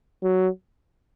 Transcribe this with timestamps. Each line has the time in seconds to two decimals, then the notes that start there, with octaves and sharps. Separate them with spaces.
0.23 F#3